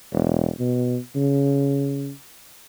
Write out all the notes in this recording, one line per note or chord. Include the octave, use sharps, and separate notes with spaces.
E1
B2
C#3